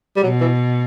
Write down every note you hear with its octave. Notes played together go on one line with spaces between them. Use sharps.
G3
B2 F#3
E3